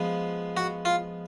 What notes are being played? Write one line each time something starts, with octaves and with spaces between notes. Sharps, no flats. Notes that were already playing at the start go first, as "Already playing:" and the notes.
Already playing: F3 G#3 B3
F#4
F4